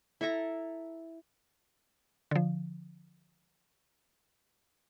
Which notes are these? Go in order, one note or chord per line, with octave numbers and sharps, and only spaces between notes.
E4 A4 E5 A#5
D3 F3